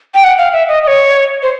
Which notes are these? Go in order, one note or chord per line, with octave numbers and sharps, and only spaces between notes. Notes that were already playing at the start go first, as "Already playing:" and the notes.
G5
F#5
F5
E5
D#5
D#5
C#5
C5